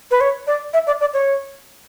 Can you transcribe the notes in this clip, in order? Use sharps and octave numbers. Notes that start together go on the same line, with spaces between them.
B4
C#5
D5
E5
D5
D5
C#5